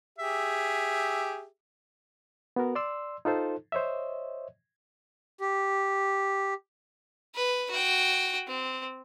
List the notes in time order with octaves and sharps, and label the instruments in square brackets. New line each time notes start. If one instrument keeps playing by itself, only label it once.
[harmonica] G4 G#4 E5
[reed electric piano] B3 F#4 A#4
D5 C6 E6
D#4 F4 A4 C5
C5 C#5 D#5 E5
[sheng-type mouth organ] G4
[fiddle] B4
F#4 G5
C4